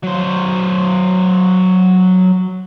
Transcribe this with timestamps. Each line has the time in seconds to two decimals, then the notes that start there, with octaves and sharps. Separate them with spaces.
0.03 F#3 C5